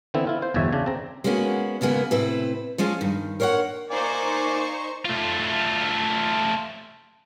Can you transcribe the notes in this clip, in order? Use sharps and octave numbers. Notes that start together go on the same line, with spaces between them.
D3 E3 B3 C4 E4
E4 F4
C5
G1 E2 B2 C#5 E5
C#3 D4
C4 A#5
G#3 A#3 B3 C#4 F#4
D#2 C#3 G#3 A#3 B3
A2 C3 C4 E4 B4
F3 G#3 C#4 F4 C5
G2 D#3
A#4 C5 C#5 F5 F#5
A#3 D#4 C5 D5 G#5 C#6
A3 F4